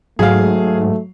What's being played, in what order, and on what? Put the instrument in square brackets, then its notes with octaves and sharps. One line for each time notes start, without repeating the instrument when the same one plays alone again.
[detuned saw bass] G#2 [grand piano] F#3 [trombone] A3 [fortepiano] G#4 F5